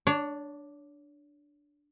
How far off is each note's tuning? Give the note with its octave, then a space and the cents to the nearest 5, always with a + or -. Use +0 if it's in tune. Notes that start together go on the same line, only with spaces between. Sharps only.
D4 +0 C#5 +30